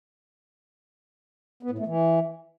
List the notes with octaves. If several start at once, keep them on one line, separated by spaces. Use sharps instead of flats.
B3
A2
A3
E3